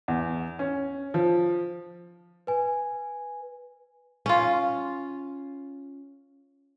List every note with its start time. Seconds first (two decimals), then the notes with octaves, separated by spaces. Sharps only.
0.08 E2
0.59 C#4
1.14 F3
2.47 B4 G#5
4.26 C#4 F4